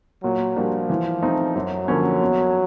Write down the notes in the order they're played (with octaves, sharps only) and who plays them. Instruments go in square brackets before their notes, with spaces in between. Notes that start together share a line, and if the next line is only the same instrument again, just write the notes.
[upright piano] A#2 [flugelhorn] F#3
[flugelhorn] F3 [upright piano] G3 A#3 D4 F#4
[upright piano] E3
A3 C4 D#4
[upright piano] F#2 [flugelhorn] F#3
[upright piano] D3 F3 A#3 C#4
E2